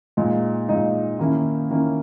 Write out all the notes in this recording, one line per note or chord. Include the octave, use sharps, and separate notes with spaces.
A#2 G#3 D#4
A#2 G#3 D#4
D#3 A#3 C#4 E4
D#3 A#3 C#4 E4